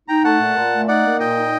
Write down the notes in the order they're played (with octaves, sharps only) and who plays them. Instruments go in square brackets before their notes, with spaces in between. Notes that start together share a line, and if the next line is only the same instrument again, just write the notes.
[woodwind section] D#4 [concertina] G5 A#5
[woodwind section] A3 [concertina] F#5 A5
[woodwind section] A#2
A#2
A3
[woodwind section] D#4 [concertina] D5 F#5
[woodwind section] A#3
[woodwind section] A#2 [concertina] D#5 G5
[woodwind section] D#4